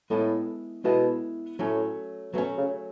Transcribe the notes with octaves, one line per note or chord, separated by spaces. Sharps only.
A2 G#3 B3 E4 A4 D#5
B2 G#3 B3 E4 A4 D#5
A2 F#3 A3 C#4
B2 F#3 A3 C#4
C#3